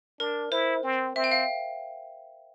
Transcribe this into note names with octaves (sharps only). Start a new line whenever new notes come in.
D4 A#4
E4 C5
C4
C4 E5
G5
F5